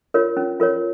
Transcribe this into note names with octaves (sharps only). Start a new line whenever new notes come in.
F4 A#4 C#5
C#4
F4 A#4 C#5